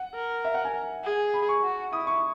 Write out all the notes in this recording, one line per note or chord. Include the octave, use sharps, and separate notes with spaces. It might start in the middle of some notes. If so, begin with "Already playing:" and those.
Already playing: F#5
A#4
E5
F#5
G#5
G#4
B5
C#6
F#4
E4 D#6
C#6